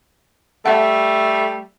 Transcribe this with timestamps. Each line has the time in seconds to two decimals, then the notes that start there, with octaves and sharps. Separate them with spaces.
0.66 G3 A3 E5 F#5